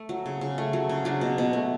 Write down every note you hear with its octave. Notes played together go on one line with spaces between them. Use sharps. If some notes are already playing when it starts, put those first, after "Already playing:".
Already playing: A3
F#3
C#3
C#3
A3
F#3
C#3
F#3 D4
B2
B2
A3